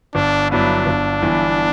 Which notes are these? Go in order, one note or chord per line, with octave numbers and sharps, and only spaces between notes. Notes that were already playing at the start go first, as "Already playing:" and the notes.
G1 D4
G2 F#3 B3 D4 E4
G1
G2 E3 B3